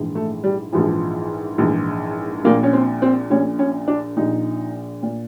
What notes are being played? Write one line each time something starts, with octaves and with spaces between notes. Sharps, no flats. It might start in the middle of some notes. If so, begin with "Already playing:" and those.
Already playing: A#1 G#2 E3
A3
G3
A#1 G#2 E3 F3
A#1 G#2 E3
A#1 A#2 A#3
C#4
C4
C4
A#1 A#2 C#4
C#4
D4
A#1 A#2 D#4
A#2